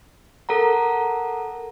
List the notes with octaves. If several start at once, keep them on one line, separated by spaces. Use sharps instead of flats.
A4 A#4 F#5 A#5